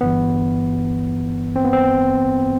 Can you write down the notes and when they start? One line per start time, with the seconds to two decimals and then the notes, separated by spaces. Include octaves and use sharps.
0.01 G1 G2 E3 B3
1.56 C4
1.65 B3
1.73 C4